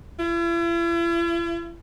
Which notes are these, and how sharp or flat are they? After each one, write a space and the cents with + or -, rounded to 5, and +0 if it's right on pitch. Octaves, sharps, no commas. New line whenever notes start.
E4 +45